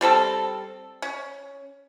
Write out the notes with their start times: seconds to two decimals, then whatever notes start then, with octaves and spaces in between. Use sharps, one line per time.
0.01 G3 C4 A4 A5
1.02 C#4